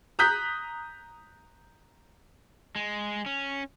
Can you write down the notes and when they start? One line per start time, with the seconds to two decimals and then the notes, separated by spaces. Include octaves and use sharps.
0.19 A#5 D#6 F#6 G6 B6
2.76 G#3
3.26 C#4